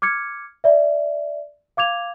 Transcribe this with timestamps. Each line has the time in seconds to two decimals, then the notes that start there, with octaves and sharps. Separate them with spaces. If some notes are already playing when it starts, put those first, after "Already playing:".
0.02 D6 F6 G#6 C#7
0.64 D5 E5
1.77 F5 D6 G#6 F7